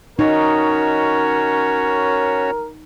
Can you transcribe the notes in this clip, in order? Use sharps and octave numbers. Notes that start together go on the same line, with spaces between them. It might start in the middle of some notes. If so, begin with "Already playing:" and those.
C#4 D#4 F#4 A#4 C#5